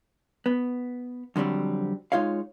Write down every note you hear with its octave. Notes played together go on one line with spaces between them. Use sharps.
B3
F2 D3 F#3 G3 C4
G#3 D#4 F4 C#5 F5